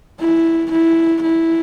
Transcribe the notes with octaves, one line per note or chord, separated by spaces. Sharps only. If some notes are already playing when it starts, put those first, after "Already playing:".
E4
E4
E4